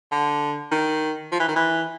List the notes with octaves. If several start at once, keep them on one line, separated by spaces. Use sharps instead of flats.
D3
D#3
F3
E3
D#3
E3